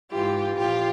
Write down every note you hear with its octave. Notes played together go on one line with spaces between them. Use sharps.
G#2 E3 F4 G4
A#2 F3 F4 G4